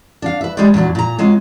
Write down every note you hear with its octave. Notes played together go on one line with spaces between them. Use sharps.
D4 F5
B4 E5
F3 G3 G#3 B4 C5 D5
E2 A#2 F#3 D4
A#2 A#5
F#3 G#3 C4 F4